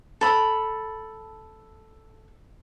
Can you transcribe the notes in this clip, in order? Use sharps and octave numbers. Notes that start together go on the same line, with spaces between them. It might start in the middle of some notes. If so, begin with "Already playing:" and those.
A4 B5